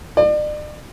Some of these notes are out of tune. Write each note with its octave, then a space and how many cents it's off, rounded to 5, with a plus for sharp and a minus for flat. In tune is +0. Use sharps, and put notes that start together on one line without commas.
D5 +40